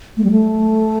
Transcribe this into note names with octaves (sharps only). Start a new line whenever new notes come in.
A3
G3
A3